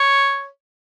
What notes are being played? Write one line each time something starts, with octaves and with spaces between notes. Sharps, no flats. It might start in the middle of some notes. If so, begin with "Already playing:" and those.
Already playing: C#5